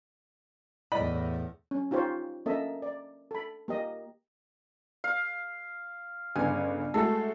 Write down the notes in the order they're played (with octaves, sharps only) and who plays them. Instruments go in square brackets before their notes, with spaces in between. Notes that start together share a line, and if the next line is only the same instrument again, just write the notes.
[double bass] E2 A2 [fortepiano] D5 D#5 B5
[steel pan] C#4
D#4 F4 G4 C5 C#5
A#3 C#4 A4 D#5 E5
D5
A4 B5
A#3 G4 D#5
[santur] F5
[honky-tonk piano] G1 C#3 [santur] G#5
[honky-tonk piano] G#3 A3 F#4 [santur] A4